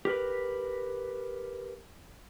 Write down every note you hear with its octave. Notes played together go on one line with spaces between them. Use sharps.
G4 A#4 B4